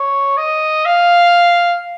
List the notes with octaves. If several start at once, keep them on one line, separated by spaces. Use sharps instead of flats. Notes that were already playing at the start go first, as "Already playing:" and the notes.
Already playing: C#5
D#5
F5